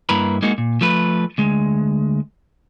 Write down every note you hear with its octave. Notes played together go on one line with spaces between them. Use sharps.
G2 A#3 E4 B4 A#5 B5
G#3 A#3 D#4 F#4
A#2
F3 A3 B4
D2 G#3